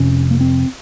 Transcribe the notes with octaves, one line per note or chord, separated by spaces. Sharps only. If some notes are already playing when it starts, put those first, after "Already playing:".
Already playing: F1 F2 C3 C#4
A#3
C4